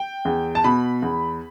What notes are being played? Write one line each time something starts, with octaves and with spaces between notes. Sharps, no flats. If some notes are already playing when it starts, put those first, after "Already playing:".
Already playing: G5
E2
A5
B2 B5
E2